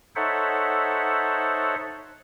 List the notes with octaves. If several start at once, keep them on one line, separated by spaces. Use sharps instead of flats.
D#4 A4 C5 C#5 E5 F#5